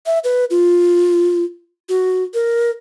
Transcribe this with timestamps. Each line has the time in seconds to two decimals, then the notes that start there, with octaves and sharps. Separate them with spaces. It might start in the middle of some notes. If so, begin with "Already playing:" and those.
0.06 E5
0.24 B4
0.50 F4
1.89 F#4
2.34 A#4